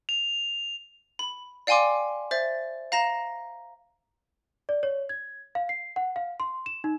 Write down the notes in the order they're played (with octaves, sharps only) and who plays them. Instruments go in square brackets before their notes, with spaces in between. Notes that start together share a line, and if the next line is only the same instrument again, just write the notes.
[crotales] F7
[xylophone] B5
D5 F5 G5 G#5 C6 D6
C5 E5 A6
F5 A#5 A#6 E7
[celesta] D5
C#5
G#6
F5
C7
F#5
F5
C6
E7
D#4